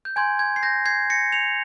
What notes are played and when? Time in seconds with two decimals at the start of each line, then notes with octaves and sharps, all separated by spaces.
0.05 G6
0.16 G#5 C6 G6 G#6
0.39 G#6
0.56 C7
0.63 G6 A#6
0.86 G#6 C7
1.10 A#6 C#7
1.32 C#7 F7